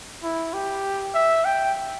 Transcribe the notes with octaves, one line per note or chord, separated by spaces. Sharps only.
E4
G4
E5
G5